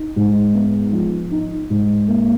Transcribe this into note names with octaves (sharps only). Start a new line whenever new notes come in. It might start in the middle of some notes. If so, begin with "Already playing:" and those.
Already playing: D#4
G#2
B3
F3
D#4
G#2
A#3